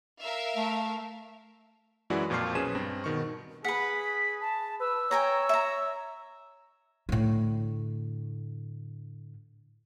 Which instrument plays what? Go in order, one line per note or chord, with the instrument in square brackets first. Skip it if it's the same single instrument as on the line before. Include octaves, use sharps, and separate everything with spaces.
[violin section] A#4 E5 F5
[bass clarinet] A3
[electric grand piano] F#2 E3 G#3 E4 F#4 D5
F2 A#2 F3 C#6 F6 C7
B1 C#4 G#4 B4 D#7 E7
G2 C4
B2 D#3 C#6
[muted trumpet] G#4 [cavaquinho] B4 F#5 [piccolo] B6
[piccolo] A5
[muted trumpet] B4 [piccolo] E6
[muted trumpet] C#5 [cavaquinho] G5 G#5 A#5
[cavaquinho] E5 A#5
[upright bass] A2 D3